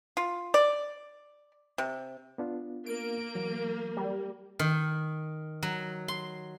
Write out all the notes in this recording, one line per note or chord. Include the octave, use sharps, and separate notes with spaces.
F4
D5
C3
B3 D4 F4
A#3 D7
E3 F#3
G3
D#3
F#3
C6